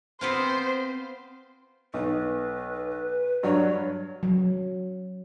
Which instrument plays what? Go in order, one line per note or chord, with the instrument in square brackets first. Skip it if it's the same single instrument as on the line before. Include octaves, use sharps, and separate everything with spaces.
[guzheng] B3 C4 F4 [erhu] C5
[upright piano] B1 [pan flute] B4
[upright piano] G2 F#3 [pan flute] C#5
[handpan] F#3